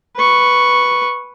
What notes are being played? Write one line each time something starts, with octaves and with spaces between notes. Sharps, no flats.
B4 C#6